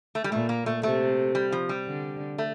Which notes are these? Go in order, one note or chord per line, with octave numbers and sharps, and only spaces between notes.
A3
G3
A#2 A3
A#3
A3
C3 A3
G3
F3
G3
D3
A3